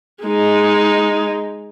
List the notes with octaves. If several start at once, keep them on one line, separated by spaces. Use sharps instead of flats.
G#3 D#4